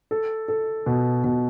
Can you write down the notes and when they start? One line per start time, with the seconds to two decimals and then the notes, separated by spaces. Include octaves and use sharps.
0.11 A4
0.48 A4
0.86 B2
1.24 B2